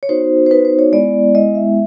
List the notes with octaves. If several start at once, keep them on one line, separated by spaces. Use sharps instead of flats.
C#5
B3 D#4 F#4 C5
C5
B3 D#4 F#4 B4
C5
C#5
G#3 B3 E4 D5
G#3 B3 E4 D#5
E5